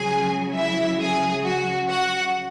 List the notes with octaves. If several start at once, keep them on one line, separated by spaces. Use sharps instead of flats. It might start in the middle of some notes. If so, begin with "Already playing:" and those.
Already playing: C#2 C#3 F#3 G#4 G#5
E4 E5
G#4
F#4
F#4 F#5